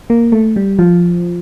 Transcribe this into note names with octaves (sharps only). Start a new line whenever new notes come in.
A#3
A3
G3
F3